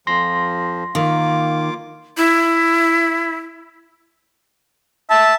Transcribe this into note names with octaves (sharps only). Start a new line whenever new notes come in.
F2 F3 C6 A#6
D#3 A#3 F4 D6
E4
E5 A5